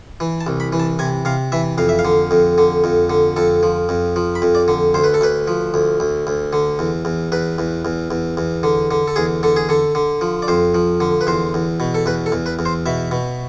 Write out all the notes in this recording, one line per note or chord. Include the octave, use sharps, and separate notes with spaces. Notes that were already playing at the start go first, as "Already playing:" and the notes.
E3
A5
C2
B5
E3
A5
C3 G#5
C3 F5
E3 E5
F2 F5
E5
F5
D3
F2
D3
F2
D3
F2 A4
F3
F2
F3
B5
F2
D5
D3
D2 C5
B4
A4
D2 B4
F3
D2
D2
D2
D3
E2
E2
E2 B4
E2
E2
E2
E2
D3
D3
A4
E2 G#4
D3 A4
G#4
D3 A4
D3
F3
D5
F2 C5
F3
D3
B4
E2 C5
E2
B2
A4
E2 B4
A4
E2
B4
E2
C5
B2 E5
B2